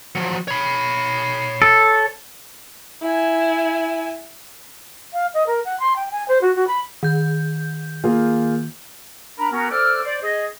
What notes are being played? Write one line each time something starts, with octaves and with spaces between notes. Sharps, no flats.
F3 F#3
C#5 B5
A4
E4 G#5
F5
D#5
A#4
F#5
C6
G5
G#5
C5
F#4
F#4
B5
D#3 G6
A#3 F4 G#4
D4 A#4 A#5 B5
B3 C#4 F#4 A#4
A4 C5 D5 D6 E6 F6
C5 D5
G#4 D#5